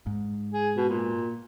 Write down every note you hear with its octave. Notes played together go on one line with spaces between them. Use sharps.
G#2
G#4
B2
A#2